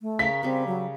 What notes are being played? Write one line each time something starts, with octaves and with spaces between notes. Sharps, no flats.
A3
C#3 A#4 B6
C#3 G3 C4
F#3